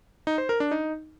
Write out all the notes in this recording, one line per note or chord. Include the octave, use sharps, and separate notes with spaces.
D#4
C5
A#4
D4
D#4